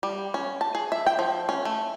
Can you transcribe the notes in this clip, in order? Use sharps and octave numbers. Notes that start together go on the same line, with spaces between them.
G3
C#4
A5
G#4
E5
G5
F3
C#4
A3